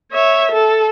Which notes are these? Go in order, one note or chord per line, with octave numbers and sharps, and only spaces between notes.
C#5 E5
A4